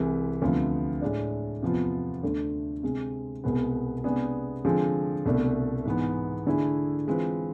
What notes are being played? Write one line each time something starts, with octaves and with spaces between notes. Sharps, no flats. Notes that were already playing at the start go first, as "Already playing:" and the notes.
Already playing: C2 C3 E3 G#3
D2 C3 F3 B3
A2 G#3 D4
E2 C3 F3 B3 F4
D2 D3 A3
C3 G#3 C4
C2 B2 G#3 B3
C3 G#3 B3 D4 G#4
D3 F3 G#3 C4 G#4
C2 B2 A3 D4
G#2 E3 B3
D3 A3 E4 G#4
E3 G#3 C4 F4 B4